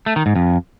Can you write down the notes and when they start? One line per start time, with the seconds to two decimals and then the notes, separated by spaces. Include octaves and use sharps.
0.06 A3
0.16 D#3
0.26 G#2
0.36 F2